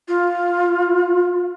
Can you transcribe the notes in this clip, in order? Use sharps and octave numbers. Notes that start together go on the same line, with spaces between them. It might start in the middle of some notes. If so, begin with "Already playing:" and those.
F4